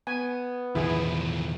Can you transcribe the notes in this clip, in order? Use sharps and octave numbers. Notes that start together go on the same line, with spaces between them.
B3 G#5
A1 E2 B2 D#3 F3 E4 G#4